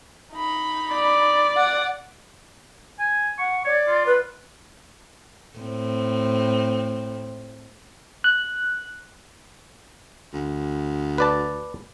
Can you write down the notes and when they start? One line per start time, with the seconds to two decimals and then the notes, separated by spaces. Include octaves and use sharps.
0.33 D#4 B5
0.93 D5
1.56 F#5 D6
2.99 G#5
3.39 F#5 C#6
3.65 C#5 D5
3.88 F4
4.06 B4
5.58 A2 C4
8.24 F#6
10.33 D2
11.18 B4 D5 A5